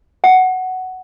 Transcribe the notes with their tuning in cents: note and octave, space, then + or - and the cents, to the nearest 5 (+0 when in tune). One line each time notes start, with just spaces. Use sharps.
F#5 +5